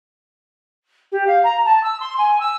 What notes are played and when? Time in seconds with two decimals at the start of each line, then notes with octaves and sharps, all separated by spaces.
1.11 G4
1.27 F5
1.43 A#5
1.65 A5
1.83 E6
2.00 C6
2.18 G#5
2.40 E6